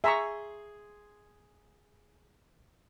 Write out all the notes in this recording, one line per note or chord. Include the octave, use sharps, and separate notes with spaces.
G#4 E5 A#5 C6 C#6